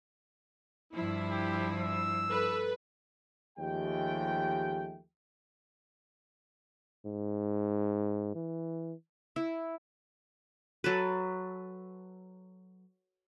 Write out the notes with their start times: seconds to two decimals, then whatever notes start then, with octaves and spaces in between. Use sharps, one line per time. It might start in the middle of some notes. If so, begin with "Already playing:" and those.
0.94 G2 F3 E4
1.31 G4
1.81 E6
2.29 A4 B4
3.58 D#2 F3 G#3 A3 G4 G5
7.06 G#2
8.35 E3
9.36 E4
10.84 F#3 A4 B4